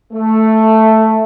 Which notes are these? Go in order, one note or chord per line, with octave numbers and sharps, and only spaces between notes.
A3